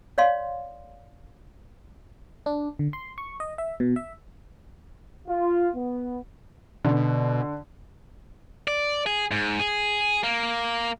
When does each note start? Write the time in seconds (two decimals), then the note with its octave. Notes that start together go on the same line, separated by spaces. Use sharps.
0.18 C#5 D5 F5 C6
2.46 D4
2.79 D3
2.93 C6
3.18 C#6
3.40 D#5
3.58 E5
3.80 B2
3.96 E5
5.28 F4
5.76 B3
6.85 B2 D3
8.68 D5
9.06 G#4
9.31 G#2
9.60 G#4
10.24 A#3